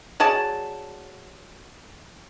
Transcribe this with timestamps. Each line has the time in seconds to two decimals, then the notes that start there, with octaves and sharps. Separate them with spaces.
0.20 F#3 G#4 D5 A5